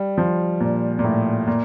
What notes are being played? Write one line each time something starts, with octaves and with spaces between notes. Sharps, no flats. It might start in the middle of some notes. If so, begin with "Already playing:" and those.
Already playing: G3
F3
A#2
A#2
A2
A#2